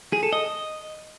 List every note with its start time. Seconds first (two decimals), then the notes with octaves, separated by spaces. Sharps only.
0.13 G#4
0.23 A4
0.33 D#5